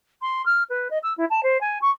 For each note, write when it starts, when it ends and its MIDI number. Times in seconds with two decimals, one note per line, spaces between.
0.21 0.44 84
0.45 0.63 89
0.69 0.88 71
0.90 0.98 75
1.02 1.13 88
1.17 1.25 64
1.30 1.40 81
1.43 1.59 72
1.60 1.78 80
1.81 1.90 85